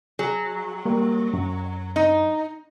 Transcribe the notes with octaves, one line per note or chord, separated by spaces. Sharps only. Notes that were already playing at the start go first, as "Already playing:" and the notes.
F#3 G#4
G3 A#3
F#2
D#4